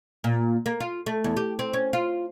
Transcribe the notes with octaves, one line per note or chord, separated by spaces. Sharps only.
A#2
A#3
F4
A3
E2
G4
C4
C#4
F4